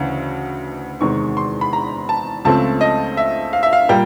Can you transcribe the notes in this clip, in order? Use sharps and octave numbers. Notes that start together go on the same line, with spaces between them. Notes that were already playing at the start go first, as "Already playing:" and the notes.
Already playing: D2 C#3 E3
E2 C3 D#3 G#3 C4 C#6
C6
B5
A#5
A5
C#2 C#3 F3 A3 C4 A5
D#5
E5
F5
E5
F5
A#2 G3 A#3 G5